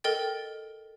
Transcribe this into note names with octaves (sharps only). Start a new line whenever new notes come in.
A4 A#4 D#5 G5 A6